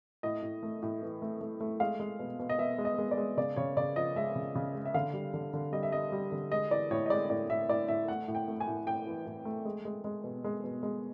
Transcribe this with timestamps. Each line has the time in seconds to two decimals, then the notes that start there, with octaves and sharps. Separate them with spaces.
0.23 A2 D#5
0.42 A2
0.63 A3
0.83 A2
1.02 E3
1.22 A3
1.41 A3
1.60 A3
1.80 G#3 F5
2.00 G#3
2.19 B2
2.39 B2
2.49 D#5
2.58 B2 E5
2.78 G#3
2.85 D#5
2.98 G#3
3.11 D5
3.17 G#3
3.37 C#3 D5
3.56 C#3 C#5
3.77 C#3 D5
3.96 F3 D#5
4.16 G#3 E5
4.35 C#3
4.55 C#3
4.75 G#3
4.85 E5
4.94 D3 F5
5.13 G3
5.34 D3
5.53 D3
5.72 G3 D#5
5.83 E5
5.92 G3 D#5
6.12 G3
6.32 D3
6.52 G#3 D#5
6.71 E3 D5
6.91 A2 C#5
7.06 D#5
7.10 G#3 D5
7.30 A2 D5
7.50 A2 E5
7.69 A2 D5
7.88 A2 E5
8.08 A3 F#5
8.28 A2
8.35 G5
8.48 A3
8.60 G#5
8.67 A2
8.87 A2 G5
9.06 E3
9.26 A2
9.45 A3
9.65 G#3
9.85 G#3
10.04 G#3
10.24 B2
10.44 G#3
10.64 B2
10.83 G#3